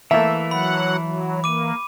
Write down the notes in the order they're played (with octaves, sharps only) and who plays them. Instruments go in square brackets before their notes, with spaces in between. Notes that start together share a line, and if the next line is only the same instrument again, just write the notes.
[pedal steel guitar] E3 [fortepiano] A3 A#3 E5
[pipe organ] F#3 F#5 [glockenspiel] B5
[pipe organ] F#3
[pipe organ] A#3 [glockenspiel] D6 D#7